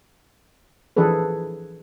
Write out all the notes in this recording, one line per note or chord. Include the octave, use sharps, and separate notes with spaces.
E3 F3 D4 G#4 A4 B4